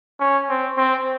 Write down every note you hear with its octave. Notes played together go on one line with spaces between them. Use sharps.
C#4
C4
C4